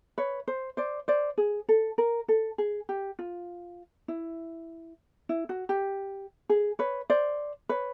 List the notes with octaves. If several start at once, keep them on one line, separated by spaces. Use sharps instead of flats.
B4 C#5
C5
C5 D5
C5 D5
G#4
A4
A#4
A4
G#4
G4
F4
E4
E4
F#4
G4
G#4
B4 C#5
C5 D5
B4 C#5